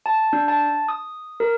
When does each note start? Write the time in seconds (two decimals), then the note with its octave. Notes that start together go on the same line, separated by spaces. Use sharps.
0.06 A5
0.33 D4
0.48 A5
0.88 D#6
1.40 A#4